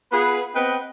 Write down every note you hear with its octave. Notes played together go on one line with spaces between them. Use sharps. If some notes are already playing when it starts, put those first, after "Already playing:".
B3 F4 G#4 B4
B3 C4 B4 D#5 G5